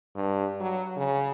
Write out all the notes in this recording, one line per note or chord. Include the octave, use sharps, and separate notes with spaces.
G2
F#3
C#3